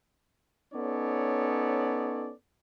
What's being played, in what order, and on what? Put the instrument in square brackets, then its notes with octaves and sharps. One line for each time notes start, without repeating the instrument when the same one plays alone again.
[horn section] B3 C#4 D#4 A4 C#5 D5